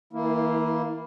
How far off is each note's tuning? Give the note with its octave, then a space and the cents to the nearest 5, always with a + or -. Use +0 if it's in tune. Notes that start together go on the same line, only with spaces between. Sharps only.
E3 -45 A#3 +0 E4 -10